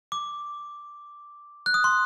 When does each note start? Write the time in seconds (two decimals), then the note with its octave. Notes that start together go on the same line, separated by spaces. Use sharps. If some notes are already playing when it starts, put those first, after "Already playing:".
0.12 D6
1.66 F#6
1.74 D#6
1.84 C6